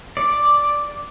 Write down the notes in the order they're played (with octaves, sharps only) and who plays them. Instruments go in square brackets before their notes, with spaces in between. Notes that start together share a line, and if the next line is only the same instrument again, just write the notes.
[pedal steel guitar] D5